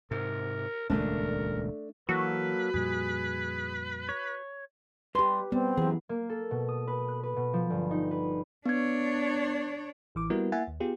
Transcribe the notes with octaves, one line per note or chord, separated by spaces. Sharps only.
G#2 C3 A#4
D#1 C#2 A#2 A3 D4 A#4
E3 F#3 A#3 F#4 A4 B4
F2 A#2 G3 G#4
C#5
G3 G4 B4 C6
G3 B3 C4
F#2 E3 G#4
A#3
A4
B2
D#6
B4
F#6
B4
B2
F3
G1
D#4
B4
B3 D4 C#5 G#6
A1 E3 D6
G3 A#3 B3 E4 F#4 A#4
A#3 E4 E5 F#5 G#5 A6
D#2
B3 F4 G4 G#4